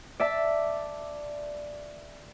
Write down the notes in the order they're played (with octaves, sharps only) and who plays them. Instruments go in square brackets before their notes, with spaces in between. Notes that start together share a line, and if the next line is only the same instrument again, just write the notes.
[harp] D5 E5 A5